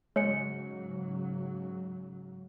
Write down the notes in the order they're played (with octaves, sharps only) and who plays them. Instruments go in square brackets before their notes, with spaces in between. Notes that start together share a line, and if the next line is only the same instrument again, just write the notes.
[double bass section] G#2 C#3 F#3 [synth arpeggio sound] G#3 [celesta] C#5 C#7